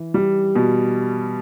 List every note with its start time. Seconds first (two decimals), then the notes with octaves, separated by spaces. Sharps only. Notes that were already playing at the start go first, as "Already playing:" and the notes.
Already playing: E3
0.14 G3
0.55 B2